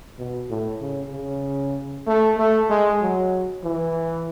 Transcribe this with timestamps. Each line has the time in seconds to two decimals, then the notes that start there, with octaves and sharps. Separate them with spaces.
0.19 B2
0.50 A2
0.81 C#3
1.12 C#3
2.07 A3
2.38 A3
2.70 G#3
3.02 F#3
3.64 E3